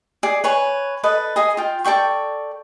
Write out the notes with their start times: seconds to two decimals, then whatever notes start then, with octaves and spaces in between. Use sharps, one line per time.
0.23 G#4 D5
0.44 B4 C#5 G#5
1.03 A4 B4 D#5
1.36 G#4 D#5 G#5
1.57 F4 G5
1.84 A4 D5 G5 C#6